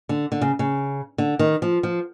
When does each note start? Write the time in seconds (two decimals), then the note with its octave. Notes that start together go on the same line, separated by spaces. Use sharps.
0.09 D3
0.32 D3
0.41 C#3
0.59 C#3
1.18 D3
1.39 D#3
1.62 F3
1.83 F3